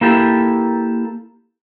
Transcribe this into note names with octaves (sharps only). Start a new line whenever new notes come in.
A#3 E4 G4 A4